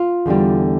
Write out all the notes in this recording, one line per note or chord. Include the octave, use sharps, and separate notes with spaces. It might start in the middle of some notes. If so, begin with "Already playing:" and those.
Already playing: F4
E2 D3 G3